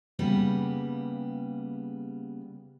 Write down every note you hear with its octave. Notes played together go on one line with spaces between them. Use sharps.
C#3 G3 A#3 B3